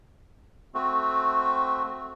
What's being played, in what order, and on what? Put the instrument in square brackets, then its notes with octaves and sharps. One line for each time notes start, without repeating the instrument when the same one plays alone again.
[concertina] A3 C4 F#4